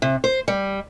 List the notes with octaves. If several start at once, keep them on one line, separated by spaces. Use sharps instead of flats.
C3
C5
G3